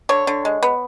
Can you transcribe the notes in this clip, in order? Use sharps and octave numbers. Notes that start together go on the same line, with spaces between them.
D3 C#5
D3
G#3
B3